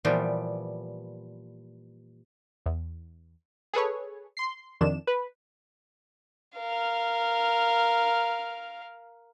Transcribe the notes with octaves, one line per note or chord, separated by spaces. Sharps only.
A#2 E3 F3 G3 B3 G4
E2
G#4 A4 B4 C#5
C6 C7
F2 C3 D#3 D4 E7
B4
A#4 F5